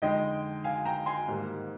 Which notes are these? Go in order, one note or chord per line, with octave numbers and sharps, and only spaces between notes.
F2 D3 G#3 D#4 D#5 G5
F5 G#5
G5 A#5
G#5 C6
G#2 D#3 G3 A#3